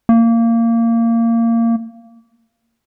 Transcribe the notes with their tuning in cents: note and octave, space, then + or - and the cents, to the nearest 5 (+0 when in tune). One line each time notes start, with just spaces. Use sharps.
A#3 -20